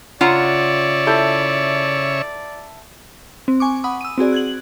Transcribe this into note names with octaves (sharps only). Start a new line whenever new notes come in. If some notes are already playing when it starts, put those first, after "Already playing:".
C#3 F4 C#5 D5 E5 F#5 A#5
E4 A4 G6
C4
G#5 C#6 D6
F#5 B5 D#6
E6 D#7
C4 F#4 G#4 D5
F#6 G#6 F#7